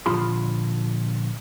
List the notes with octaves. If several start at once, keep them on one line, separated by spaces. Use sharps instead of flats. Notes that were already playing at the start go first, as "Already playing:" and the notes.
A#2 D3 F3 F4 B5 C6